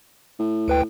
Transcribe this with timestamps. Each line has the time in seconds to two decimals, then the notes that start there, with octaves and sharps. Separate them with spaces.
0.39 A2
0.68 D2 B4 G5